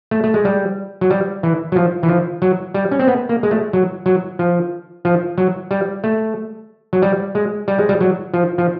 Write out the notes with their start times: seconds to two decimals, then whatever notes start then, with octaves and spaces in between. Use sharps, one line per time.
0.11 A3
0.24 A3
0.34 G#3
0.45 G3
1.01 F#3
1.10 G3
1.43 E3
1.72 F#3
1.76 F3
2.03 E3
2.09 F3
2.42 F#3
2.74 G3
2.91 C#4
2.99 C4
3.08 B3
3.29 A#3
3.43 G#3
3.51 A3
3.73 F#3
4.06 F#3
4.39 F3
5.05 F3
5.38 F#3
5.71 G3
6.04 A3
6.93 F#3
7.02 G3
7.35 G#3
7.68 G3
7.79 G#3
7.89 G3
8.01 F#3
8.34 F3
8.58 F3